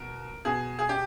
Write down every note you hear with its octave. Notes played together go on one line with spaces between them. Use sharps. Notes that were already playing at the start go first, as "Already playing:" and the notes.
Already playing: B2 A#4
B2 G#4
G#4
G4